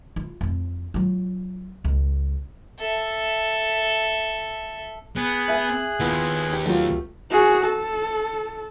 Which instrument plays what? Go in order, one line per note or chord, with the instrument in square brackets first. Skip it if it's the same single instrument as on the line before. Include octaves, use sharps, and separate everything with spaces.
[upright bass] E4 F4
F2 C4
F#3 F4
C#2
[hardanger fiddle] A4 E5
[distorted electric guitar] B3 [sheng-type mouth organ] G#4 F#6
[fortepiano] E5 G#5
[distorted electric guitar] D#2 [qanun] B3 E4 F4
[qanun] G4
[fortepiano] F#3 F4 [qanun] A3
[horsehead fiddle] F#4 G#4
A4